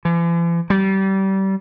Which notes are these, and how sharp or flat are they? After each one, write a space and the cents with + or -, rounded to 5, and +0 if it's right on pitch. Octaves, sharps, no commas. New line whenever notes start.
E3 +45
G3 -25